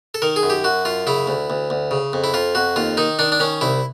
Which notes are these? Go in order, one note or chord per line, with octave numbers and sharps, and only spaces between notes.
A4
D#3 A#4
G#4
F#2
G4
F#2 F#4
F#2 F4
C#3 E4
D2
D2
D2
C#3
F2
E4
F2 F4
F2 F#4
D#2 F4
D#3 D#4
D#3 D4
D4
D#3 C#4
C2 E4